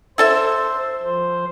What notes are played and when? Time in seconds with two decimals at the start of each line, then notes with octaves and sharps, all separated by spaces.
0.18 E4 A4 C5 E5
1.04 F3 C5